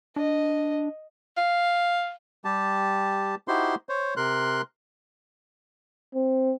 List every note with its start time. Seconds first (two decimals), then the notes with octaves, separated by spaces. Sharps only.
0.16 D4 D#5
1.37 F5
2.45 G3 G4 A5
3.48 D#4 E4 F#4 G4 C5 C6
3.89 C5 C#5
4.17 C3 A#4 C6 F#6
6.15 C4